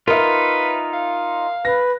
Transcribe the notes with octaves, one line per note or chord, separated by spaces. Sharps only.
D#4 F4 A#4 B4 E5
F5
B4 A#6